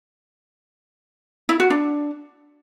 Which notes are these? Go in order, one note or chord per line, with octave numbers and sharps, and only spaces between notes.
E4
F#4
D4